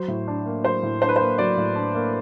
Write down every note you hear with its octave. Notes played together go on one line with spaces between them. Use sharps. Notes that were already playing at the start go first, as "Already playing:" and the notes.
Already playing: F#3 C5
A2
D4
A#3
F#3 C5
A2
D4 C5
B4
C5
A#3
F#3 D5
A2
D4
A#3